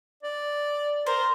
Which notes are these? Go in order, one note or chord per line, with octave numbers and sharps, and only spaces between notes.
D5
A#4 C5